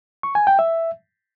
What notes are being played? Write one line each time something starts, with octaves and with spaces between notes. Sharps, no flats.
C#6
G#5
G5
E5